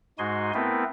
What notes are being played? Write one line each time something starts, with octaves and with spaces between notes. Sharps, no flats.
G#2 G#3 D#4 F#4 G#5 C6
A3 B3 C4 E4 A#4 B4